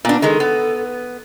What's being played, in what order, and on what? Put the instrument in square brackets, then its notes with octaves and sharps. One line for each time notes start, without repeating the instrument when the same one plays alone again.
[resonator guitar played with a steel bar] A#2 D4 [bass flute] B3
[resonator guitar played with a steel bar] D#3 G#3 [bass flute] A4
[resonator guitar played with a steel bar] B3